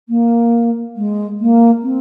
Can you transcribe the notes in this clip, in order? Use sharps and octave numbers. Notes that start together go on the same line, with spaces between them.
A#3
G#3
A#3
C4